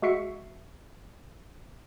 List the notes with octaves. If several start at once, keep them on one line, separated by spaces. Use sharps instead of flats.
G#3 F#4 E5 C7 C#7